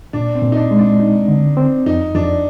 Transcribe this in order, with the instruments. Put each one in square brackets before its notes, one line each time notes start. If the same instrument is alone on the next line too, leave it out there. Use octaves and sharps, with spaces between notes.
[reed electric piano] A#2 [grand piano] D4
[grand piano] C4
[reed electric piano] A#2
[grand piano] D#4
D4
[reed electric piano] G#3
[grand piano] D4
[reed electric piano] D#4
D3
C4
[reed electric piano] F2 [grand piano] D#4
[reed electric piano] F2 [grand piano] D4